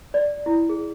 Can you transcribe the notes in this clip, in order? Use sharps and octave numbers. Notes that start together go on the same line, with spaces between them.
D5
E4
G#4